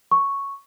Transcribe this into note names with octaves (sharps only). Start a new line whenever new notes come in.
C#6